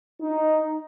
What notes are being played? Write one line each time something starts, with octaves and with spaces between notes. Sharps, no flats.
D#4